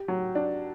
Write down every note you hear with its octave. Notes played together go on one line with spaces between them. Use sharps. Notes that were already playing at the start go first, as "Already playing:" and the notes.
Already playing: G4
F#3
D4